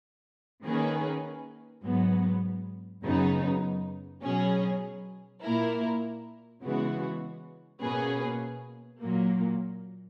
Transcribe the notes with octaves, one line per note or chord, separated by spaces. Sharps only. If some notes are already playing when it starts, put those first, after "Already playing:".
D#3 A#3 C#4 G#4 B4
G#2 F#3 B3
F#2 C#3 F#3 B3 D#4
B2 F#3 C#4 G#4
A#2 A#3 E4 A#4
C#3 E3 G#3 B3 F#4
B2 A#3 C#4 G#4 B4
A#2 F#3 A#3